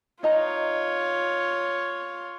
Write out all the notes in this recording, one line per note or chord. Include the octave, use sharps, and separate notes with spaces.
D#4 F4 C#5 D#5 A#5